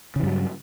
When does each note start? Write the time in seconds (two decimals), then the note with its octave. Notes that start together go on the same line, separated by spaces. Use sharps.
0.16 C#3
0.19 E3
0.23 G2
0.27 F#3